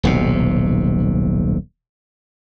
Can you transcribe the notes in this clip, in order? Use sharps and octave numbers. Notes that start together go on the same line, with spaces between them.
D#1 B1 C3